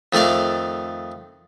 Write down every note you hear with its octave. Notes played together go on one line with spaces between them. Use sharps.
F2 D#3 A3 D5 F5